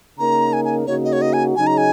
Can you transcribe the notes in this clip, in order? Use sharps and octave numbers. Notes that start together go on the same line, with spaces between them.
C#3 A#3 D#4 A#4 A#5
G#5
G#5
C#3 A#3 D#4 F#4 C#5
D#5
C#5
D#5
G#5
C#3 F#3 D#4 G#4 G#5
A#5
G#5